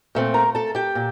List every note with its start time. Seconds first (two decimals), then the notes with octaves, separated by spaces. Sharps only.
0.15 A#2 A3 C4
0.34 A#4 A#5
0.55 A4 A5
0.75 G4 G5
0.95 A#2